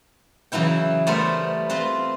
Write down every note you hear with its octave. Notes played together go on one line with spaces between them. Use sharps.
C#3 E3 F#3 E4 G5
G3 A3 B3 E4 A#4 C5
C4 F4 B4 C6